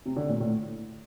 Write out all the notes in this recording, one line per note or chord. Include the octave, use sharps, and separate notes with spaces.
C3
D3
A#2
A2